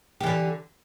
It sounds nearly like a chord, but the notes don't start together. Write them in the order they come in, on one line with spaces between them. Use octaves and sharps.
G4 E3 D3